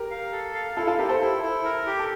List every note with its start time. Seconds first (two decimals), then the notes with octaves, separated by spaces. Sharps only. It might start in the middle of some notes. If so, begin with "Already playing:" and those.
Already playing: G4 A#4
0.11 F5
0.32 A4
0.55 F5
0.77 E4 F4 A4
0.87 F4 A4
0.98 E4 G4 A#4
1.09 A4 C5
1.21 E4
1.42 E4
1.64 A#4
1.87 G4
1.99 A4